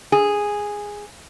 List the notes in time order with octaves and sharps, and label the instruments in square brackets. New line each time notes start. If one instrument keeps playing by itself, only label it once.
[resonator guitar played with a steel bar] G#4